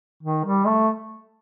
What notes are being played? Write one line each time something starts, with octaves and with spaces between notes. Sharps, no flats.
D#3
G3
A3